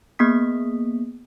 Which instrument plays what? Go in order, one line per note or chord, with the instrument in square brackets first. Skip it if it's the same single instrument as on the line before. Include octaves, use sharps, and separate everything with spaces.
[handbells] A#3 B3 G#4 D#6 B6